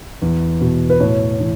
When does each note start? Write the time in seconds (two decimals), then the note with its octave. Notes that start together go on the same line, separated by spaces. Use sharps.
0.22 E2
0.61 B2
0.90 B4
1.00 A2 C#5
1.40 E3